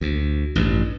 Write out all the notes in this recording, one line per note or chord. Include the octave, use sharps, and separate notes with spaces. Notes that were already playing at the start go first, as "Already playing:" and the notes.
D2
A1 G2